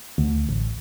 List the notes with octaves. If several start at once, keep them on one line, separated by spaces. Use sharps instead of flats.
D2
A1